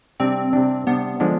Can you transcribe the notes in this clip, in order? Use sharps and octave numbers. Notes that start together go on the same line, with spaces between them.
C3 G3 C4 D4
C3 G3 D4
C3 G3 B3 D4
D3 F3 G#3 D4